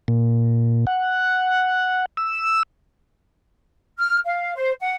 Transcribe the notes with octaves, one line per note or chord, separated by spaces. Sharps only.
A#2
F#5
E6
F6
F5
C5
F#5